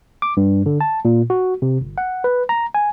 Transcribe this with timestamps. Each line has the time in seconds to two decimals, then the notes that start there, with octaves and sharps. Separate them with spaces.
0.22 D6
0.37 G2
0.66 D3
0.81 A5
1.05 A#2
1.30 F#4
1.62 C3
1.81 G1
1.98 F#5
2.24 B4
2.49 A#5
2.75 G#5